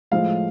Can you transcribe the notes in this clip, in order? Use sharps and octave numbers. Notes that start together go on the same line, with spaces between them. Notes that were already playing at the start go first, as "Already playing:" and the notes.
A2 F3 G#3 F5